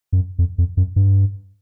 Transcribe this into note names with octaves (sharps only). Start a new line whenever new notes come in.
F#2
F2
F2
F#2
G2